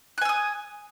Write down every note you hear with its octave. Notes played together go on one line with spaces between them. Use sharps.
G#5 D#6 E6 F#6